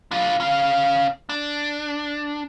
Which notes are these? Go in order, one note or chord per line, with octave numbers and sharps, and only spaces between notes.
D4 F4
C#4 F5
D4